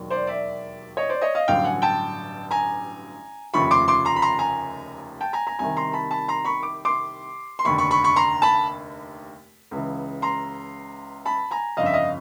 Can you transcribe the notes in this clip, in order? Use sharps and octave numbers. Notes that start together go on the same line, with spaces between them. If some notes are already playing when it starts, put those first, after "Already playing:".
Already playing: E1 D#2 D#3 F#3
C5 D5
D5 E5
C#5 D#5
C5 D5
C#5 D#5
D#5 F5
A1 G2 D3 F#3 F5 G5
F#5 G#5
G5 A5
G#5 A#5
F1 D#2 C#3 F3 A3 B5 C#6
C6 D6
C6 D6
A#5 C6
B5
A#5 C6
G#5 A#5
G5 A5
G#5 A#5
G#5 A#5
C2 C3 D#3 G#5 A#5
A#5 C6
A5 B5
A5 B5
A#5 C6
B5 C#6
D6
C6 D6
C6
F1 D#2 D3 B5 C#6
B5 C#6
B5 C#6
B5 C#6
A#5 C6
A5 B5
C#2 C#3 E3
A#5 C6
A5 B5
G#5 A#5
G1 F2 C#3 D#5 F5
E5
D#5 F5